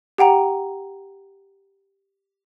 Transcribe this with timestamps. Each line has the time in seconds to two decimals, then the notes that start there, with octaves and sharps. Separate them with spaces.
0.18 G4 F#5 G5 A#5